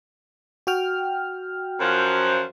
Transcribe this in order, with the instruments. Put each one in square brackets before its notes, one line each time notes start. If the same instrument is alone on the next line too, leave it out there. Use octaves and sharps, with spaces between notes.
[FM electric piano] F#4 G5 F6
[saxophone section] F#2 F3